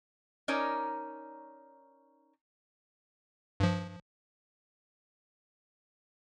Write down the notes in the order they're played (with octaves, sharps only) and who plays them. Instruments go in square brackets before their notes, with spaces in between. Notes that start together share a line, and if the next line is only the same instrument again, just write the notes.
[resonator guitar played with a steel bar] C#4 D#4 A#4 C#5 D5
[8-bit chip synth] G2 F3